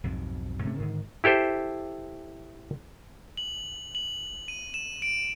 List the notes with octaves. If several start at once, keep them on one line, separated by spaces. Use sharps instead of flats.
B1 F2 G#2
G#2 C3 A3 C#4
G#2 D3 D#3
E4 G4 A4 C5
F#7
F#7
D#7
E7
D7